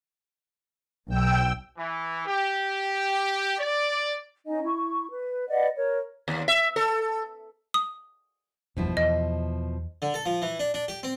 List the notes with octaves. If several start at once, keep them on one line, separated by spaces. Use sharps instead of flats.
B1 G5 E6
E3
G4
D5
C#4 D#4 D#5 G#5
E4 C#6
B4
B4 D5 D#5 F#5
A#4 C#5
D#2
E5
A4
D#6
G1 E2 G2 B2 F3 E4
E2 D#5
D3
A4
F3
E3
D4
D4
G4
C4